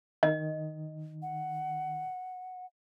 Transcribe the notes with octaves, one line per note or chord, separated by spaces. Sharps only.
D#3 D#5
F#5